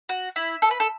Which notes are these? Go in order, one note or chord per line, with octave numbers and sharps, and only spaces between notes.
F#4
E4
A4
B4
A4